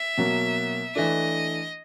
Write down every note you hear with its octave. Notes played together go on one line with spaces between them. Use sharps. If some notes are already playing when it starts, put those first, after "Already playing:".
Already playing: E5
B2 F#3 A#3
E3 A3 D4 D#5